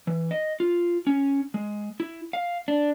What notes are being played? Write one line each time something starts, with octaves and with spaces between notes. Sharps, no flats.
E3
D#5
F4
C#4
G#3
E4
F5
D4